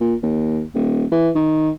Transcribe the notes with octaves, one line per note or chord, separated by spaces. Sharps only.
A#2
D#2
D#1
E3
D#3